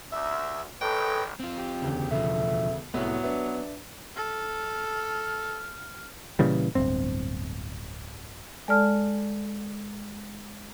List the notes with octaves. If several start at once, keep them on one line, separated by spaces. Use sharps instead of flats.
D2 E5
G#1 A4 B4 C#5 D#5 G5
C4 F4
G4
E1 D2 C#3
B2 F3 A3
C2 A2 F#3 B3
D4 B4 E5
A4 F6
A#2 C#3 E3 G3
D1 G1 C4
G#3 A4 D5 A5 F6